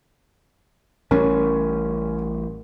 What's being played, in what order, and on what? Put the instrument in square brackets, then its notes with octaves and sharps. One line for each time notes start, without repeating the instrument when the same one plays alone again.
[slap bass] A1 G3 [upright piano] C#4 [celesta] A#4